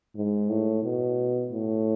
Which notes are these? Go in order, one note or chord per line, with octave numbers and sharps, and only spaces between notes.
G#2
A2
B2
A2